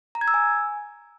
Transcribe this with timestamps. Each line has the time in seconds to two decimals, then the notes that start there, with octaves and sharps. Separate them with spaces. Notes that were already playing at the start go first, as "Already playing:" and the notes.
0.15 A#5
0.21 G#6
0.28 E6
0.34 G#5